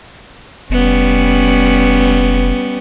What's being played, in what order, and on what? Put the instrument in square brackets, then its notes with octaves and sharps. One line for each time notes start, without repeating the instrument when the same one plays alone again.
[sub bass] F1 [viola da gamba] G3 B3 C#4